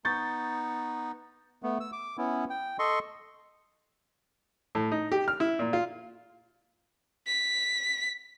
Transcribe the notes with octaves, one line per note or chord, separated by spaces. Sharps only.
B3 D#4 C#6 G6 A6
A3 B3
E6
D6
B3 C#4 E4
G5
A4 D#5 C6 C#6
A2
D#4
G4
F6
E4
A#2
F4
B6